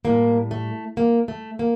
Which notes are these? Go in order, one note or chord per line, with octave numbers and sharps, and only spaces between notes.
A2 G3 A#3
A3
A#3
A3
A#3